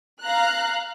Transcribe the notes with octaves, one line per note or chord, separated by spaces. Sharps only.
F5 A#5 F#6